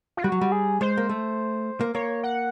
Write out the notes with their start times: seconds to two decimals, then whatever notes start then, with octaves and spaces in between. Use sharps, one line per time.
0.17 F4
0.23 G3 F#4
0.32 F#3
0.41 G3
0.52 G#4
0.81 G#3 C5
0.98 A#3
1.09 A3
1.81 A#3
1.95 A#3 C#5
2.23 F#5